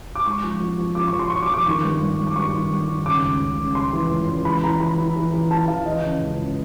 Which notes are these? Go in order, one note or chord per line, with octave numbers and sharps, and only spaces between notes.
D6
G#2 C#6
F3
F3
F3
F3 D6
C#6
F3
C6
F3 C#6
D6
F3
D6
D#3 C#6
G2
G2
G2
D6
G2 C#6
D#3
G2
D#3
C#3 D6
C#2
C#2
C#3
C#3 C6
E3
C#2
C#2
E3 B5
E3 A#5
E3 B5
E3
E3
E3
E3 A5
E3 F5
E3 D#5
C#3
C#2
C#2